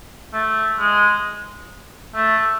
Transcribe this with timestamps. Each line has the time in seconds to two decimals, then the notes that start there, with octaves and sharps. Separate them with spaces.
0.33 A3
0.79 G#3
2.15 A3